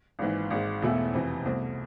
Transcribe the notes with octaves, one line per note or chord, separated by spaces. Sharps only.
G#1 G#2 E3
G#1 G#2 G#3
E1 E2 B2 A3 E4
F2 C3 E3
C2 B2 A3 C4